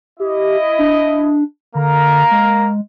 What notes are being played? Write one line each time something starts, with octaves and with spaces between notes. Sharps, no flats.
E4 G4 D#5
D4
D3 A#3 A#4 A#5
G#3